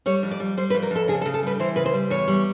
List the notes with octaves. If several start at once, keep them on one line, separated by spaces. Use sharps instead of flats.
G3 C#5
F2
D5
G3
G3 C5
B4
F2
A#4
F2 A4
C#3 G#4
A4
C#3
A4
G3 B4
E3 C5
C#3 B4
C5
G3
E2 C#5
G3